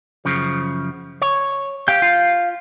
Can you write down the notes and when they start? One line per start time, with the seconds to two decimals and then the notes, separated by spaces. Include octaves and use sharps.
0.25 F#2 C#3 F3
1.22 C#5
1.88 G4 F5 G6
2.02 F4